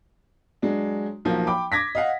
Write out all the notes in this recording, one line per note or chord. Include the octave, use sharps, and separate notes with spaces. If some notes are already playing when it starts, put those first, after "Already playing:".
F#3 G#3 D4
B1 F3 F#3 A#3
G5 B5 D6
D6 G#6 A#6 B6
D#5 F5 F#5